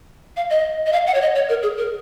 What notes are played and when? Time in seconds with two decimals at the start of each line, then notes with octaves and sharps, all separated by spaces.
0.37 F5
0.50 D#5
0.86 D#5
0.93 F5
1.07 F#5
1.15 C#5
1.21 D#5
1.35 C#5
1.49 A#4
1.63 G#4
1.77 A#4